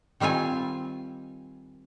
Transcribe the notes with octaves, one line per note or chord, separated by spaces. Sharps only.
D#3 G3 C4 F4 G#5